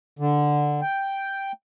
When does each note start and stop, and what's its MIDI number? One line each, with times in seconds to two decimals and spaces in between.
0.19 0.81 50
0.82 1.52 79